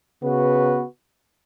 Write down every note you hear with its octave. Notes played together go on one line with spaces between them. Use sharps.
C#3 B3 F#4 B4